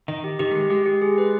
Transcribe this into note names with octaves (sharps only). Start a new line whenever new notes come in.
D#3 D#5
G4
D#3 G4
A3
G#3 G4
G#3 G4
G4
G#4
B4